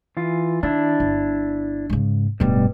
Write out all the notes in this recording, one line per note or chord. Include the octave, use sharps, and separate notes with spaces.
E3 F4
D#3 D4 E4
G1
G#2 C#3
D1 G2 B2 G3